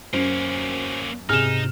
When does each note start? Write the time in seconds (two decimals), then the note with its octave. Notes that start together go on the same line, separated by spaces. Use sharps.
0.14 F#2 A#3 C#4 C5
1.29 G#2 C3 D#4 G#4 F6 E7